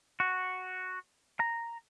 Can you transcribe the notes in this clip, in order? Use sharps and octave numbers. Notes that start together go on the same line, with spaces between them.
F#4
A#5